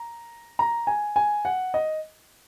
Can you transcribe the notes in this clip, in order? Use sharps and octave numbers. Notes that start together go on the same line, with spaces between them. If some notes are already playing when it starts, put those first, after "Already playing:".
Already playing: A#5
A#5
G#5
G#5
F#5
D#5